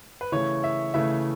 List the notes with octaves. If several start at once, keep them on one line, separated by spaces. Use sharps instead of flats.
B4
C#3 E3 A3 C#5
E5
C#3 E3 A3 E5